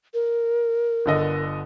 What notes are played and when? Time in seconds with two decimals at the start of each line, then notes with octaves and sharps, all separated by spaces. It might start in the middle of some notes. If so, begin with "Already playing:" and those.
0.14 A#4
1.06 G1 D3 D#5